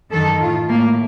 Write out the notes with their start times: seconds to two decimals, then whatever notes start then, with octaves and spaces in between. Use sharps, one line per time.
0.12 F#2 D#3 A4
0.41 A2 F4
0.69 A2 A#3